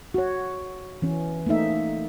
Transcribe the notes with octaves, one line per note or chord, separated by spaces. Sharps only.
F#4 C#5
E3 C#4
A3 A#3 D#4 E5